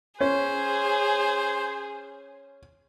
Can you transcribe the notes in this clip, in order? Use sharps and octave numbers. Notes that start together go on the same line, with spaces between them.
C#4 G#4 C5